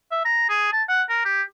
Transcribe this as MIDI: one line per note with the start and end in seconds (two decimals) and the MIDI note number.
0.11 0.24 76
0.25 0.49 82
0.49 0.72 68
0.72 0.82 81
0.89 1.02 78
1.09 1.22 70
1.25 1.42 67